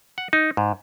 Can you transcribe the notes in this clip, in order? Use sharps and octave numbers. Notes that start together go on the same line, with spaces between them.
F#5
D#4
G#2